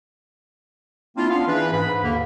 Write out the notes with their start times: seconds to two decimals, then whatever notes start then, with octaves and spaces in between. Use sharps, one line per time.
1.17 A#3 C4 D4 E4 F4
1.30 B3 C#4 D4 F4 F5
1.47 E3 D4 E4 G#4 B4
1.72 G#2 B5
2.03 D#2 D3 A#3